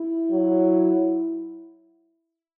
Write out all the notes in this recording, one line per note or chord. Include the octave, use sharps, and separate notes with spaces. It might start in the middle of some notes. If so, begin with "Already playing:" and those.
Already playing: E4
F#3